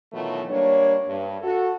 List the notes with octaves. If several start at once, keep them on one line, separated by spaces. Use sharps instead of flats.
B2 D#3 E3 F#3 A3 F4
G3 A#3 D4 C#5
G2
F#4 A4